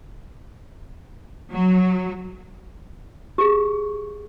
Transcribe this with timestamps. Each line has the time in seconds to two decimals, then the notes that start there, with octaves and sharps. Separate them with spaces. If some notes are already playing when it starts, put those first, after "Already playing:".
1.51 F#3
3.38 G4 G#4